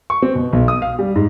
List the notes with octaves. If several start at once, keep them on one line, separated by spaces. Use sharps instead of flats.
C#6
C4
B2
B1
D#6
F5
G3
G#2